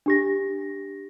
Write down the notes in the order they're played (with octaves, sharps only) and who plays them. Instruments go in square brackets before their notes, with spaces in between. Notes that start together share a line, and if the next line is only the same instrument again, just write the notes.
[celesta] D4 G4 A#6